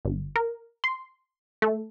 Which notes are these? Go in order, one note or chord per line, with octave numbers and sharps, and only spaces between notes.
G1
A#4
C6
A3